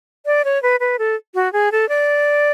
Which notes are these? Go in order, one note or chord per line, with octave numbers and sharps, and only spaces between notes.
D5
C#5
B4
B4
A4
F#4
G#4
A4
D5